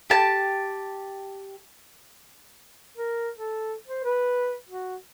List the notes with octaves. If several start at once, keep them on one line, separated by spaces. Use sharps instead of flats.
G4 A5
A#4
A4
C5
B4
F#4